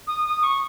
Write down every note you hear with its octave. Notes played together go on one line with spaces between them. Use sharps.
D#6
D#6
C#6